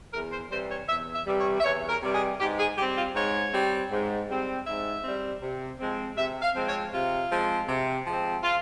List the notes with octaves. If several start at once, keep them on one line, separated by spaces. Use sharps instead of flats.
E2 A#4
C5
C3 E3 G3 C5
C#5
E2 E5
E5
C3 E3 G3
C#5
E5
E2 C#5
A#4
C3 E3 G3
G#4
G#2 G4
G#4
G3 C4 G4
F4
G#2 C#5
G3 C4
G#2
G3 C4
G#2 E5
G3 C4
C3
F3 G#3 C4
C3 E5
F5
F3 G#3 C4
C#5
C3 F4
F3 G#3 C4
C3
F3 G#3 C4
F4